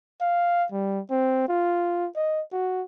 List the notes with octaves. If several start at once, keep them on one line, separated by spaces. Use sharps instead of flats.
F5
G3
C4
F4
D#5
F#4